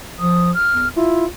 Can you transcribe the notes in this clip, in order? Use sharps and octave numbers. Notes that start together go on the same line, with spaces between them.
F3 D#6
F6
E2
E4 F4